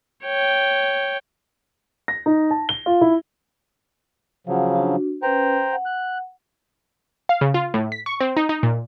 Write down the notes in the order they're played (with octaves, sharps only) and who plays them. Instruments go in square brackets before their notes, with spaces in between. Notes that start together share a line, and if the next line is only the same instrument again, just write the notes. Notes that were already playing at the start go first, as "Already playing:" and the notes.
[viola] C#5 G5
[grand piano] A#6
D#4
A5
G7
F4
E4
[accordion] C#3 F3 F#3 [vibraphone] F5 F#5
[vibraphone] D4 F#4
[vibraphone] C#4 B4 [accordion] C5 G5 A#5
[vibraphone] F#5
[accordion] F#6
[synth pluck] F5
C#3
F4
A2
B6
C#6
C4
D#4
D#4
A#2